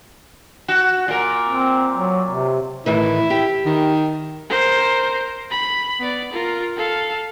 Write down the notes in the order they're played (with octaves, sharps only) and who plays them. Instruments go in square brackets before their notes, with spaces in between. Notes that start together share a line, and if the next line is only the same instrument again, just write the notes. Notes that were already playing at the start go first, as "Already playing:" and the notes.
[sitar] F#4
A#2 A#4
[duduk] C4
F#3
C3
[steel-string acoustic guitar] A2 D#3 E3 [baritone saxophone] E4
[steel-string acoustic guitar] G4 G5
[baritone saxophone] D#3
[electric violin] A#4 C5
B5
B3 D5
F4 A#4
A4 F5